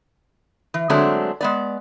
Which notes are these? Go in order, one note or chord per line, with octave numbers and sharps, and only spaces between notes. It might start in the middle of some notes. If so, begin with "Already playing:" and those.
E3
D3 F#3 G#3 A3 C4 D4
G#3 B3 D5